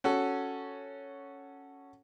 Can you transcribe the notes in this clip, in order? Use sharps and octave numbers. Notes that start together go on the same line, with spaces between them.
C#4 F#4 A4